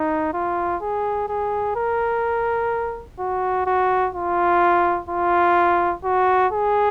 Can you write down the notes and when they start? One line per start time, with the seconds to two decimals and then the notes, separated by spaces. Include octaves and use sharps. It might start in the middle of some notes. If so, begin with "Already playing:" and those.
Already playing: D#4
0.34 F4
0.81 G#4
1.29 G#4
1.76 A#4
3.19 F#4
3.67 F#4
4.15 F4
5.09 F4
6.04 F#4
6.53 G#4